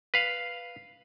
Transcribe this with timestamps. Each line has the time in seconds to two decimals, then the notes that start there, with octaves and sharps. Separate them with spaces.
0.14 B4 F5